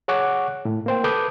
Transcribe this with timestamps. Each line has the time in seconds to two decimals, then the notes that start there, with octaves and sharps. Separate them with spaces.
0.08 G#4 C#5 F#5 C#6 D6 F#6
0.65 A2
0.86 A#3 C5 G5
1.04 A4 B4 D6 D#6 G6